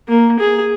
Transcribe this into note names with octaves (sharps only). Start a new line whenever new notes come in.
A#3
G#4